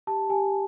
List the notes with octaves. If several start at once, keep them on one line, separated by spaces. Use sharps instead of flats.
G4 A5
G4 G#5